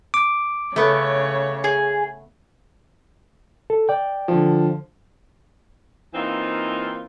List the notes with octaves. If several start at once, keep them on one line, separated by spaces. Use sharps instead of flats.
D6
C#3 A3 B3 C#5
G#4
A4
D5 G5
D3 F3
E3 A#3 C4 D#4 F4